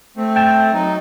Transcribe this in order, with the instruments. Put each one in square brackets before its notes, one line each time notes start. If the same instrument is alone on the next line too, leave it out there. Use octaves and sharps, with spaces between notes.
[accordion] A3 C4
[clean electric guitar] G5 A5
[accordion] F#3 D#4